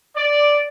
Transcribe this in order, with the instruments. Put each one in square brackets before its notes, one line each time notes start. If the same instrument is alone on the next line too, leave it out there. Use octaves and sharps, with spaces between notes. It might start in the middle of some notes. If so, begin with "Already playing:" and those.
[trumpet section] D5